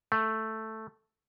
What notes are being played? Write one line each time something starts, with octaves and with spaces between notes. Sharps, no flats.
A3